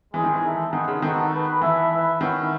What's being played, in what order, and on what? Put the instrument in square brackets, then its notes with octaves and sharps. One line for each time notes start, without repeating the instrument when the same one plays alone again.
[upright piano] E3 [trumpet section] G#3 C#4 G#4
[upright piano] D#3
E3
[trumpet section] D#4 A4 E5
[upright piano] D#3 [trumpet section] G#3 D#4 G#4 B4 F#5
[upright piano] C#3
[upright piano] D#3 [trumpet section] B3 D#4 F#4 A4
[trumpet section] B3 F#4 B4
[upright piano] E3 [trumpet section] E4 A4 E5
[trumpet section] E4 B4 E5
[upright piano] D#3 [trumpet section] C#4 E4 B4 F#5